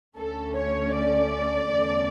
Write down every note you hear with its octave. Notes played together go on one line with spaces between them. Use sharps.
D2 D3 A3 C#4 A4
C#5
D5
E2 D3 A3 C#4